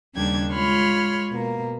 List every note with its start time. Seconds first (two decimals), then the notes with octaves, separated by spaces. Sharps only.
0.15 D#2 C#3 G3 D4 G5 G#6
0.51 G#3 F4 C#5 B5 C6 F6
1.29 B2 A#3